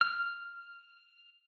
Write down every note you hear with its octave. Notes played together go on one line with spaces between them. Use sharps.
F6